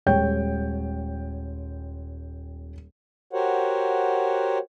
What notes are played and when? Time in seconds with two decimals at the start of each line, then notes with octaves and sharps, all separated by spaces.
0.06 D#1 G#3 C#5 G5 G6
3.33 F#4 G4 A#4 C5 C#5 F#5